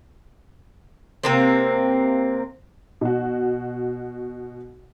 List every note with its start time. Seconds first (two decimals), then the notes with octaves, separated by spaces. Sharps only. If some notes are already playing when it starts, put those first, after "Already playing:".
1.24 C3 A#3 C4
3.01 B2 F#4